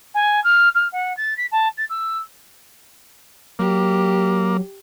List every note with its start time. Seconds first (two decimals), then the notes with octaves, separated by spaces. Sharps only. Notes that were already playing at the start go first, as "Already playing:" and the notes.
0.15 G#5
0.44 F6
0.75 F6
0.92 F#5
1.17 A6
1.37 B6
1.52 A5
1.78 A6
1.90 E6
3.59 F#3 A#3 G4